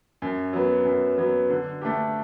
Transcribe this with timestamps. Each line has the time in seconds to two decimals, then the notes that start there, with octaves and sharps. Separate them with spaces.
0.22 F#2
0.53 F#3 B3
0.85 F#2
1.18 F#3 B3
1.49 D3
1.81 A3 D4 G4